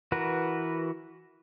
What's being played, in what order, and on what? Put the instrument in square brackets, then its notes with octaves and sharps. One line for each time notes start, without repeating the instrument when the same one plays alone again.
[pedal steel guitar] E3 F#4 A#4 B4